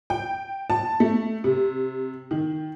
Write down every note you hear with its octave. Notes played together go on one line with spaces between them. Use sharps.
G5
A5
A3
C3
D#3